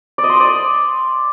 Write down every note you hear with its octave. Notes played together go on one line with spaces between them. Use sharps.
D5
D#5
C6
D#6
D5